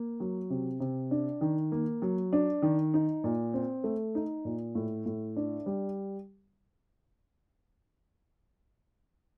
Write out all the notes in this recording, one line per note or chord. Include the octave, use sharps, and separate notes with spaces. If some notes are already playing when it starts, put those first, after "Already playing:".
Already playing: A#3
F#3
C3
C3
D4
D#3
A#3
F#3
D4
D#3
D#4
A#2
C4
A3
D#4
A#2
A2
A2
D4
G3